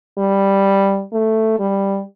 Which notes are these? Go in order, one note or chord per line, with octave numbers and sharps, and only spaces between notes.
G3
A3
G3